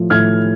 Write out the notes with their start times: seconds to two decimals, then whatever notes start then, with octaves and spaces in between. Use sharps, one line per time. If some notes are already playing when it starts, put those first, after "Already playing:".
Already playing: A2 F3
0.10 A2 F6 G#6